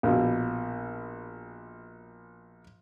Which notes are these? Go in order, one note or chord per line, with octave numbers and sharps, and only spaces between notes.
A#1 B2